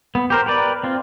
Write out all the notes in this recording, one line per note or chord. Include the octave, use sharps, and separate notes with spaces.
B3
G4 A#4 C5
G4 A#4 B4 D5
C4 F4